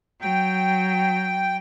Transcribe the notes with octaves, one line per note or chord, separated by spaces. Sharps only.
F#3 G5